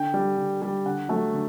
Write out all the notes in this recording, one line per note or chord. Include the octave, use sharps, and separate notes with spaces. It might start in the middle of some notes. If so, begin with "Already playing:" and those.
Already playing: D3 G5
G3
D3
G3
D3 F#5
F#3 A3
D3